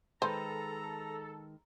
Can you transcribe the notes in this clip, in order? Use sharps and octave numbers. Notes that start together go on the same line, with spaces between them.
D#3 G#3 A4 B4 C5 A#5